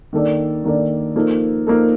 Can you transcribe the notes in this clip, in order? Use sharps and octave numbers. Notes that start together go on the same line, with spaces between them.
D#3 A#3 D4 A4 D5
D#3 A#3 D4 A4 D5
F3 A#3 D#4 A4
F3 A#3 D#4 A4